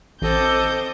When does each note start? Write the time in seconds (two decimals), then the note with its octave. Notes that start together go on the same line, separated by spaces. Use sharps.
0.22 A1 C4 A4 D#5 D6 G6